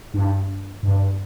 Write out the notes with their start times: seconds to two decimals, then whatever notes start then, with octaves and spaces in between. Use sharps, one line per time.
0.14 G2
0.83 G2